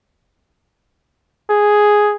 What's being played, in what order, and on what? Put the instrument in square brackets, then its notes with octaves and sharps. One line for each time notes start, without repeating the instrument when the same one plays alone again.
[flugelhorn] G#4